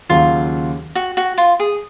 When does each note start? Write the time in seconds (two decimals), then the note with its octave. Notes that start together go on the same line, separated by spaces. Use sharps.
0.09 D#2 C#3 F#3 F4
0.95 F#4
1.17 F#4
1.38 F4
1.60 G#4